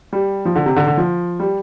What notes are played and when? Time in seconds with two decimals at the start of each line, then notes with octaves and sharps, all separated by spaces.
0.13 G3
0.45 F3
0.55 D3
0.66 C3
0.76 D3
0.87 D3
0.97 F3
1.40 G3